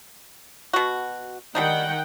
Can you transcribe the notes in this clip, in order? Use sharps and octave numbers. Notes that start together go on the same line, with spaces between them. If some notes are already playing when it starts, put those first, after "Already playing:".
B2 F#4
D#3 G3 D4 D#4 F#5 G5